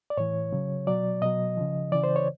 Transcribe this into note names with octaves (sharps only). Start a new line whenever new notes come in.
D5
A2 E3 C#5
C#3 F#3
B2 F#3 D5
B2 F#3 D#5
C#3 F3
C#3 E3 D5
C5
C#5